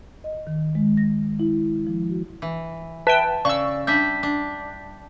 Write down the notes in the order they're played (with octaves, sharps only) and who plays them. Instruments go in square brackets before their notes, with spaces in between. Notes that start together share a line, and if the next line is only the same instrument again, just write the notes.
[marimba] D#5
D#3
G#3
A#6
E4
F3
F#4
[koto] E3
[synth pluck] B4 E5 G5 [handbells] A5
[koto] C#3 [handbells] D5 [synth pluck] C#6 E6
[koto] G3 D4 E5 [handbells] G6 B6
[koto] D4